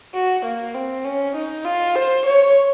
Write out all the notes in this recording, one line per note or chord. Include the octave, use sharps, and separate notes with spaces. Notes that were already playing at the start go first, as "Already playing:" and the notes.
F#4
A#3
C4
C#4
D#4
F4
C5
C#5